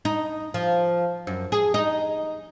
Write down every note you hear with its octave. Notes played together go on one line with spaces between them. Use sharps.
D#4
F3
F#2
G#4
D#4